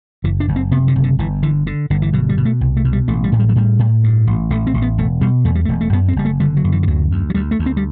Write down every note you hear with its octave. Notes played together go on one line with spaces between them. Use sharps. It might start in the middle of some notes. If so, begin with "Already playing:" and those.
F#1 E3
D4
F#1
C4
C3 B3
D3
F#1
D3
G1 E3
D3 E3
D3
G1 D3
E3
B2 F#3
G3
B2
A3
C2
A3
B2
G3
A1 A3
G3
A2
G3
F#3
A2 G3
A2
G2
A1
A1 A3
C4
A1
B3
E1 A3
B2 G3
E2 A3
G3
A3
E1
A3
F#2 B3
C4
F#1 G3
A3
D3 G3
F#3
F#2
E3
E3
D2 F#3
D2
F#3
D2 G3
A3
D2
C4
G3